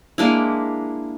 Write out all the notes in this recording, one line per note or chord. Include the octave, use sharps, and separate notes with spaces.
G#3 A#3 D4 E4